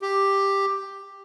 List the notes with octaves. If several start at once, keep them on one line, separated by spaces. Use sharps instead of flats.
G4